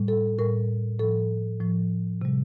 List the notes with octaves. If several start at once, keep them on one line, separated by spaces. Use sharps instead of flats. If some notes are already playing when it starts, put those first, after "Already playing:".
Already playing: A2 G3
A4
A2 G3 A#4
A2 F3 A4
A2 F3
C3 G3